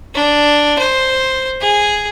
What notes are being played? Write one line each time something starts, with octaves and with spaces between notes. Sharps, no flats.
D4
C5
G#4